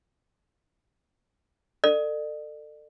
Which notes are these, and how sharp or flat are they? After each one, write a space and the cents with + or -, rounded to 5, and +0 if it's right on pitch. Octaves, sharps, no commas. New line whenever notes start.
A4 +30 D5 +40